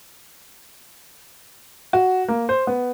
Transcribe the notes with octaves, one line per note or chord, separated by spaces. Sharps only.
F#4
A#3
C5
B3